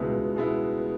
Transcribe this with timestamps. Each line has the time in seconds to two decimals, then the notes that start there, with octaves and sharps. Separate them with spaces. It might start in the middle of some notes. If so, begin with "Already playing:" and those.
Already playing: C#2 B2 G#3 B3 E4
0.12 C#2
0.35 B2 G#3 B3 E4